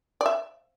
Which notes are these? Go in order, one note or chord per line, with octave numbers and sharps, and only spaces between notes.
D5
E5